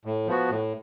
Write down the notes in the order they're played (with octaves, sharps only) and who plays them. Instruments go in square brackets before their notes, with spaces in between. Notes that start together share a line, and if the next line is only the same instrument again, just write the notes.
[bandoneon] A2
F3 B3 F#4
A2